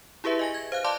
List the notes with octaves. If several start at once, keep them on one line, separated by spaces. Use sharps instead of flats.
E4 G4 G#4 B4 E5
D#5 G#5 A#6
G#6
C5 F5 F#6
D5 F5 A5 C6 D6